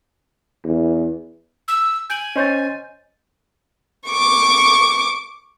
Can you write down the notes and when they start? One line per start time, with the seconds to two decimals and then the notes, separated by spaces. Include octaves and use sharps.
0.64 E2
1.68 E6
2.10 G#5 G6 D7 F#7
2.36 C#4 C5 C#5 D#5 G6 A6
4.08 C#6 D6